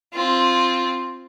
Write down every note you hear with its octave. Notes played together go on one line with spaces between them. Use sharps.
C4 F4